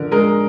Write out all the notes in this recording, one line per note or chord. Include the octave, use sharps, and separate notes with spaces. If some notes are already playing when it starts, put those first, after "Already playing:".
Already playing: D3 F3 A#4
G#3 A#4